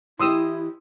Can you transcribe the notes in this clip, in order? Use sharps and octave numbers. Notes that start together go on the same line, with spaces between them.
E3 E4 G4 D#5 C6 D#6 E6